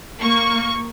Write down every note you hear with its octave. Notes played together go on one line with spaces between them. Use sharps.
A#3 C#6